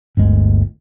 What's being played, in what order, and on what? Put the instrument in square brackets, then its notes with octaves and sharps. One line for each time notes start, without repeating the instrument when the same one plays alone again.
[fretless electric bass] G1 D2 G#3